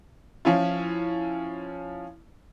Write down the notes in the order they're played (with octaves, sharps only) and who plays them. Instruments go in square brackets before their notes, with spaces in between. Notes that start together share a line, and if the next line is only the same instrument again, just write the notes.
[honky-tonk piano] F3 C#4 E4 F4